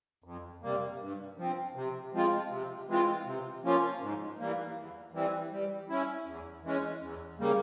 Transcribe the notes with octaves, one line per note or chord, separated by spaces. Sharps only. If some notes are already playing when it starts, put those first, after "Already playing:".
F2
C3 G3 A#3
G2
F3 C4
C3
F3 G#3 C4 F4
C3
E3 G#3 C4 F4
C3
F3 A#3 C#4 F4
G#2
E3 G3 A#3
E2
E3 G3 C4
G3
C#4 E4
E2
E3 G#3 C#4
E2
C#3 G3 A#3